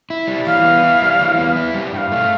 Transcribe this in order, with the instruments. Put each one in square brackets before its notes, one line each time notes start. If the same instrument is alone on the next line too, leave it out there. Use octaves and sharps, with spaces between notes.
[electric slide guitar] E4
G3
[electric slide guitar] E3 [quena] F5
[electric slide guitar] B3
E4
G3
E3
B3
E4
G3
[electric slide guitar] G2 [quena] G5
[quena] F5
[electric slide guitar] A3